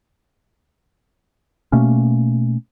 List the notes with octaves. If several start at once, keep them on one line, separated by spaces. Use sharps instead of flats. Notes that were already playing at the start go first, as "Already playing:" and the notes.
B2 A3 A#3 C#4